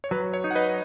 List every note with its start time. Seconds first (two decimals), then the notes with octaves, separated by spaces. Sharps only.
0.04 C#5
0.11 F#3 B4
0.34 C#5
0.44 D#4
0.51 F#5
0.55 B4 D#5
0.66 B4